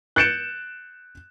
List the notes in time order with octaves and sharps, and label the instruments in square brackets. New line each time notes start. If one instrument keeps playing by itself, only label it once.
[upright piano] F#6 G6 A6 C#7 D7 E7